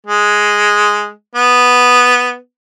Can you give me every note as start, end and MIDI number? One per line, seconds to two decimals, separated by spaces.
0.07 1.10 56
1.35 2.35 59